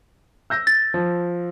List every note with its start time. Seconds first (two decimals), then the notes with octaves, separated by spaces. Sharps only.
0.50 E6 G6 A#6
0.67 A6
0.94 F3